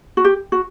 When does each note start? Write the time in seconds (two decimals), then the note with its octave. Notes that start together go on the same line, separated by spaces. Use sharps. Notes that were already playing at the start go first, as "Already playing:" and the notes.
0.17 F#4
0.25 G4
0.52 F#4